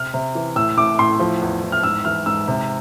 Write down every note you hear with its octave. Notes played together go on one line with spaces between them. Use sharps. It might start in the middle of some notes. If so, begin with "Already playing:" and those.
Already playing: C3 F6
C3
E3
A2 E6
A2 D6
A2 C6
F3
E2
E2
F6
G#2 E6
E3 F6
G#2 E6
C3